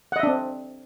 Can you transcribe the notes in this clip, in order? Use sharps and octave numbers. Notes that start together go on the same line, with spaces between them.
C4 D4 D#5 E5 F#5